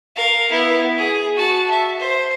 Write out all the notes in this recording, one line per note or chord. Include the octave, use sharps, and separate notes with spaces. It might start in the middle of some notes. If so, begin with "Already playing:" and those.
A#4 F5
B3 E4
G#4
F#4 A5
E5
C5